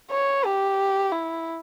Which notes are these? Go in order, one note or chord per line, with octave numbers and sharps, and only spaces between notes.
C#5
G4
E4